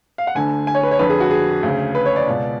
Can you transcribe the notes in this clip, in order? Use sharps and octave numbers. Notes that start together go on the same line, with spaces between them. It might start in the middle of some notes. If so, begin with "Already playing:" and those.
F5
F#5
D2 D3 G#5
G#5
C#5
B4
C#5
F2 D3 B4
G#4
F#4
G#4
D2 C#3
B4
C#5
D5
C#2 B2